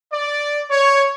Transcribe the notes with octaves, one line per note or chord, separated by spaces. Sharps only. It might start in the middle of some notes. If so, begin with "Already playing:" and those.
D5
C#5